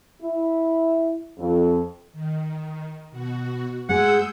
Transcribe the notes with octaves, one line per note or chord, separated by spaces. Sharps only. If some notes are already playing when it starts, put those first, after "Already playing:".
E4
F2
D#3
B2 F#4
G#2 G#3 G#4 F#5 E6 G6